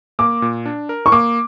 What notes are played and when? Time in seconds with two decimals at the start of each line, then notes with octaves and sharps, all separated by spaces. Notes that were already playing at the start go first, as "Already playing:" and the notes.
0.19 A#3 D6
0.42 A#2
0.66 D4
0.89 A#4
1.06 C#6
1.12 A#3 D6